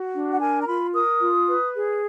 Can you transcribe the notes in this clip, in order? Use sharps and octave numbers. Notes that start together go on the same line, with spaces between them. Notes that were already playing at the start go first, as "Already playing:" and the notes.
Already playing: F#4
D4
F#5
A#4 G#5
A#5
F4 B5
A#4 D#6
F4
B4
G#4